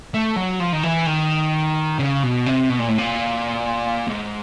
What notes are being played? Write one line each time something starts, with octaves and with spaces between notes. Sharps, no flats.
A3
F#3
F3
D#3
E3
D#3
C#3
B2
C3
B2
A#2
A2
A#2
G#2